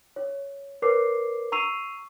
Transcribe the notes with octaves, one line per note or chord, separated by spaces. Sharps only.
C#5
A#4 B4 C#5 D6 C7
A#5 C#6 E6 C7 D#7 F7